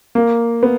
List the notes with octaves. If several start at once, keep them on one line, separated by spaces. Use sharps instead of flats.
A#3
B3